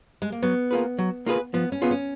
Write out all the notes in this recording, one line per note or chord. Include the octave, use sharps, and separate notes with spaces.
G#3
A#3
F#3 B3
A#3 F4 G#4 B4
F#3
A#3 F4 G#4 B4
F3 B3
C#4
B3 F4 G#4
C#4